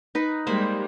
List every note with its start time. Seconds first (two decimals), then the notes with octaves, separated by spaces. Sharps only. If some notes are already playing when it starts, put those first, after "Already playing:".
0.15 D#4 B4
0.47 G3 G#3 A#3 C5 B5